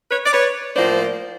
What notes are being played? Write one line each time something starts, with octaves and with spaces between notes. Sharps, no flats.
B4 C#5
D5
B4 C#5
A2 F3 A#3 C5 D5